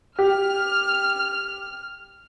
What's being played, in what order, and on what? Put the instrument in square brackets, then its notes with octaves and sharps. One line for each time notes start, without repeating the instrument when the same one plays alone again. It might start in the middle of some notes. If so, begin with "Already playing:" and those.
[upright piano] G4 [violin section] F6